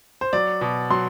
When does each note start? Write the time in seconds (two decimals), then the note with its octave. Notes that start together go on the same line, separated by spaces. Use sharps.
0.21 C5
0.33 F#3 D5
0.61 B2
0.90 F#3 C6